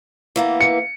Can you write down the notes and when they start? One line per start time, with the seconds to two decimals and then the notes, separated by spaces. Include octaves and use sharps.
0.36 E3 A#3 B3
0.61 C#7